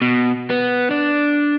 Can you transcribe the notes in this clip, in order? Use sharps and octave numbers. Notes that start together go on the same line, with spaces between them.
B2
B3
D4